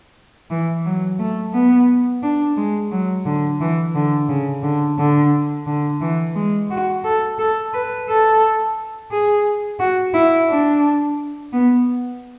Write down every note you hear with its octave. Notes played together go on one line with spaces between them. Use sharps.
E3
F#3
A3
B3
D4
G#3
F#3
D3
E3
D3
C#3
D3
D3
D3
E3
G#3
F#4
A4
A4
B4
A4
G#4
F#4
E4
D4
B3